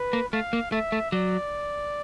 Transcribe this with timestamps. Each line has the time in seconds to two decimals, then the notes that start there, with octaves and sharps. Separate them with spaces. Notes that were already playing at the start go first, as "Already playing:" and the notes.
Already playing: B4
0.13 A#3
0.33 A3 F5
0.53 A#3
0.72 A3 E5
0.92 A3
1.12 F#3 D5